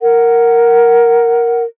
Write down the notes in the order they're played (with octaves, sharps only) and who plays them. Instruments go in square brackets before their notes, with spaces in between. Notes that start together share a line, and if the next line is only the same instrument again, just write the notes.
[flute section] A#4 F#5